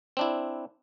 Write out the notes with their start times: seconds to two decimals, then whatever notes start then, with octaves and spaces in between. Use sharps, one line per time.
0.17 C4 D4 E4